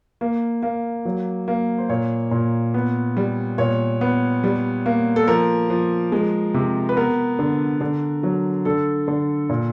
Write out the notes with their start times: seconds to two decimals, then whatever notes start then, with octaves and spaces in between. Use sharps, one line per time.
0.21 A#3
0.63 A#3
1.05 F#3
1.48 A#3
1.78 C5
1.89 A#2 C#5
2.31 A#2
2.74 B3
3.17 G3
3.58 A#2 C#5
4.01 B3
4.44 G3
4.86 A#3
5.16 A4
5.28 F3 A#4
5.70 F3
6.12 G#3
6.54 C3
6.89 B4
6.97 B3 A#4
7.39 D3
7.81 D3
8.23 F#3
8.65 D3 A4
9.08 D3
9.49 A#2